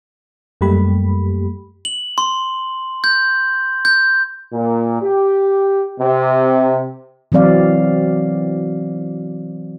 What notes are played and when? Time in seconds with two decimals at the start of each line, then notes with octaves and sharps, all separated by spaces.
0.61 F#2 G3 A3 A#3 G4 B5
1.85 F#7
2.18 C6
3.04 G6
3.85 G6
4.53 A#2
5.02 G4
6.00 C3
7.32 E3 F#3 C4 D5 F5